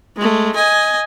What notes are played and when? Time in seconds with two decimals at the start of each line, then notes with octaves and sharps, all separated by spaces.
0.16 G#3 A3
0.56 D#5 G#5